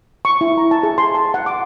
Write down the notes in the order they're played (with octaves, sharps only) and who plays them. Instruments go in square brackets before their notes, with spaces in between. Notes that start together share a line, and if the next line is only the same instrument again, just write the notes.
[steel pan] C#6
E4
A#5
A5
G#4
C6
A5
F#5
D6